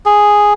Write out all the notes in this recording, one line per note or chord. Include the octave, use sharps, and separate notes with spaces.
G#4